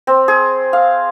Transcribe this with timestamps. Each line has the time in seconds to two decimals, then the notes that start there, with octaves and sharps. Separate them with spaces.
0.07 C4
0.28 G#4
0.73 F5